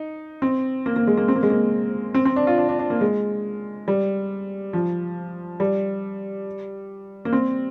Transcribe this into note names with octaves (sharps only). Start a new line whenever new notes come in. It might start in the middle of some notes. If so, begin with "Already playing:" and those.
Already playing: D#4
C4
A#3
A#3
G#3
A#3
C4
A#3
G#3
A#3
C4
C4
D4
F4
D4
D4
D4
A#3
G#3
G3
F3
G3
A#3
C4